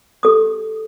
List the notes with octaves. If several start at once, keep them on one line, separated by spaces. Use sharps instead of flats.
G4 A4 D#6